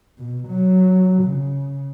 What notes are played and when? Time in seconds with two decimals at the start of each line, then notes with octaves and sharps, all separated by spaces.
0.18 B2
0.48 F#3
1.23 C#3